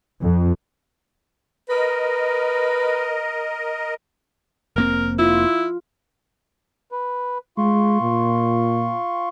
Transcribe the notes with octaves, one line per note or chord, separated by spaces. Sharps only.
F2
A#4 B4 D#5
F1 A#3 C4 A#4
E4 F4
B4
G#3 F4 C6 C#6
A#2